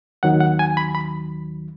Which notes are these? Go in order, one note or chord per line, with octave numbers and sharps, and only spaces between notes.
D#2 D#3 F#3 F#5
F#5
G#5
B5
B5